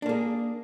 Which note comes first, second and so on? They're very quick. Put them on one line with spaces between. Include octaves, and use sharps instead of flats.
D4 A#3 G#4